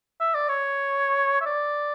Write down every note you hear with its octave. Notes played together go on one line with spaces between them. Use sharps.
E5
D5
C#5
E5
D5